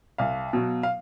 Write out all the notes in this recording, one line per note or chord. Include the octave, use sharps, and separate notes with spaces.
C2 F5
B2 F#3
F5